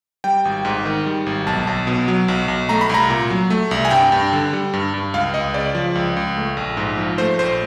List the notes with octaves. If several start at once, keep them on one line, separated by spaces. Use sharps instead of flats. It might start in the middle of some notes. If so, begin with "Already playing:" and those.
G3 G5
G#1
G#2
D#3
G3
G#1
B1 A5
B1
B2
F#3
B1
B1
A3 A#5
B5
C2 A#5
A#2
F#3
A3
C2
G#5
G2 G5
G2
D3
G3
G2
G2
C#2 F5
C#2 D#5
C#3 D5
F3
C#2
C#2
A3
A#1
G#2
F3
A3 C5
A#1 C5